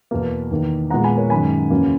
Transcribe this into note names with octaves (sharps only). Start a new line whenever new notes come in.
E2 B2 A#3
E2 D#3 A#3
A#2 G#3 B3 F#5 A#5
G#5 B5
A#4 C#5
F#2 D#3 G#3 G#5 B5
E2 C#3 F#3 A#3